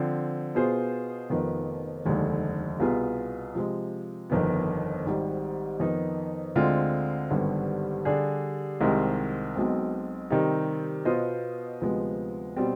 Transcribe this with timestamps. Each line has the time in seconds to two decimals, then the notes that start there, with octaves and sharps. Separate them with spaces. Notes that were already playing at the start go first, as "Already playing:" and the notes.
Already playing: D3 F3 C4
0.55 B2 B3 F4 G#4 C5
1.30 F1 F2 D#3 B3 F4
2.05 F1 D#2 D3 G#3
2.80 C2 B2 B3 F4 G#4
3.55 C3 F3 G#3
4.30 G1 F2 D#3 B3
5.06 G#1 G#2 G3
5.80 F2 D#3 B3 D#4
6.56 D2 D3 G#3 C4 F4
7.31 G#1 G2 D3 G3 B3
8.05 D3 G3 D4 G#4
8.81 C2 C3 D#3 G#3 C4
9.56 B1 B2 G#3 C4
10.30 C3 D#3 G3 C4 D#4
11.05 B2 B3 F4 C5 D#5
11.81 D2 C3 F3 G#3 B3
12.57 B2 G3 C4